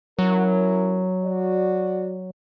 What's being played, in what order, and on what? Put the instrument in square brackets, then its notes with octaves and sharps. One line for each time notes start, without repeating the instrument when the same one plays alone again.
[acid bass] F#3 [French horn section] C#4 E4 A#4
[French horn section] F#4 D5